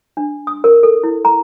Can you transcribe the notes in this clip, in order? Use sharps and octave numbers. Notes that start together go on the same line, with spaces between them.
D4
D#6
A#4
A4
E4
A#5